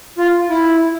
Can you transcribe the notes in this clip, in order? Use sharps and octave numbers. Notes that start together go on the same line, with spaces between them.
F4
E4